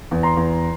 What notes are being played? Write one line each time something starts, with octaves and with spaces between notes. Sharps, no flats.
E2
A#5 C6
E2